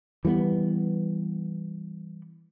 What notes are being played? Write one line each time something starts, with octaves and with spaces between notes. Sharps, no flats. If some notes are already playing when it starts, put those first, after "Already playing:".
E3 G3 A3 B3